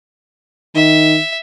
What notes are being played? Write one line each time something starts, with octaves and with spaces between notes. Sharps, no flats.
D#3 E5